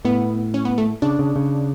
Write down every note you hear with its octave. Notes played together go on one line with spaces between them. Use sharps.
A2 B3
C#4
B3
A3
C#3 D4
C#3
C#3